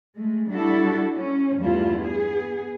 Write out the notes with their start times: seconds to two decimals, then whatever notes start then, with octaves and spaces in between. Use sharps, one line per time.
0.16 G#3 A3
0.50 G3 D4 E4 F#4 A4
1.14 C#4
1.58 E2 G2 A3 E4 F4
1.98 B3 G#4